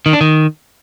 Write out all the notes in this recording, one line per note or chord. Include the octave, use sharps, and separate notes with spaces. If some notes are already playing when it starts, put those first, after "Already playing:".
D#3
D4
D#3